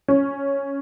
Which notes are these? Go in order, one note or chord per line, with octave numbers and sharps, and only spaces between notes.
C#4